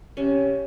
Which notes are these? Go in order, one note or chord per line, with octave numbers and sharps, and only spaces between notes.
C3 C#4